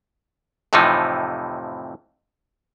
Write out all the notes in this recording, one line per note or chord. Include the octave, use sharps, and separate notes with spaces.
F2 A2 C3 E3 F3 D#4